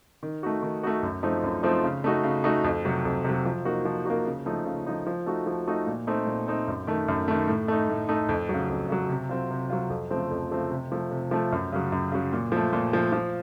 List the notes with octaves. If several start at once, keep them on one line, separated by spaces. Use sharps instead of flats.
D#3
A3 D#4 F#4
D#3
A3 D#4 F#4
F#2
F3 A3 C4 D#4
F#2
F3 A3 C4 D#4
C#3
A3 D#4 F#4
C#3
A3 D#4 F#4
F2
C3 F#3
F2
C3 F#3
F3
A#3 D#4 F#4
F3
A#3 D#4 F#4
C#3
F3 A3 D#4
C#3
F3 A3 D#4
F3
A3 D#4 F#4
F3
A3 D#4 F#4
A#2
A3 C4 D#4
A#2
A3 C4 D#4
F#2
D#3 A3
F#2
D#3 A3
A2
A3 D#4
A2
A3 D#4
F2
C#3 F#3
F2
C#3 F#3
C3
F#3 C4 F4
C3
F#3 C4 F4
F2
C#3 F3 A3 C4
F2
C#3 F3 A3 C4
C3
F3 A3
C3
F3 A3
F#2
C#3 F#3
F#2
C#3 F#3
A#2
F3 A3
A#2
F3 A3
F3